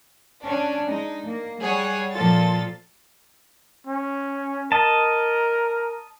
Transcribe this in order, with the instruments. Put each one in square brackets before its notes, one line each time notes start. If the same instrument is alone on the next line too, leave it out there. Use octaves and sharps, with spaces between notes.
[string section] C#4 D4
G#3 D#4
A#3
G3 G#4 C#5 F#5
A#2 F3 F4 A4 A6
[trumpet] C#4
[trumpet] A#4 [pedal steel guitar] D#5 A5